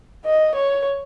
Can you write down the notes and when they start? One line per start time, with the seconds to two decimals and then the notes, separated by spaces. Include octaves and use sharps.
0.25 D#5
0.55 C#5